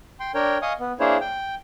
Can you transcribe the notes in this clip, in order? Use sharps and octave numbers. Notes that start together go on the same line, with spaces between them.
G5 C6
D4 A#4 C#5 G5
D#5 F5 G#5 C#6 D#6
B3
A#3 D4 E4 G#4 C5 C#5
G5